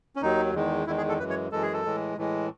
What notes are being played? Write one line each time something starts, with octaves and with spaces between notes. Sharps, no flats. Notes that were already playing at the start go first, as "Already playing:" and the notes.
C#4
D#2 D#3 F#3 D#4
E2 D#3 G#3
E2 D#3 G#3 E4
G#4
A4
F#2 E3 G#3 B4
C#5
F#2 E3 G#3 A4
G#4
A4
A2 E3 G#3
A2 E3 G#3